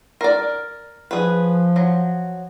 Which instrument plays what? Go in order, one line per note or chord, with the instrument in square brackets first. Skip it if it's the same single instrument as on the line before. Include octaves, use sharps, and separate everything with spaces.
[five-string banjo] A#4 D5
[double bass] F3 [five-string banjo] G#4 B4
[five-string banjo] F#3